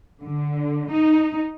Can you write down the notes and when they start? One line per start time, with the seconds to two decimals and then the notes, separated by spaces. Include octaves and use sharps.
0.22 D3
0.91 D#4